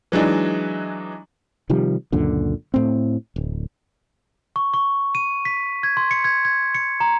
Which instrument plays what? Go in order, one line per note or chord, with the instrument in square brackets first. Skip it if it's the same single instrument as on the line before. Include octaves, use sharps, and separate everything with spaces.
[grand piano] E3 F#3 G#3 D4 D#4
[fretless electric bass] C3 D#3 F3 G3
C#2 F#2 A#2 D3
A2 C4
D1
[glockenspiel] C#6
C#6
D#7
B6
G#6
C6
C#7
G#6
G#6
C#7
A#5